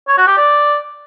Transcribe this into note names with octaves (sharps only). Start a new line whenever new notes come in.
C#5
F#4
G4
D5